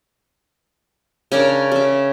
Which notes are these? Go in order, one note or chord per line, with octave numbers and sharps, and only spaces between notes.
C#3 C#4 D4 A#4
C#3 E5